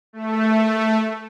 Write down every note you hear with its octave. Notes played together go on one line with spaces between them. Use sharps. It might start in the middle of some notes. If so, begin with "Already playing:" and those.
A3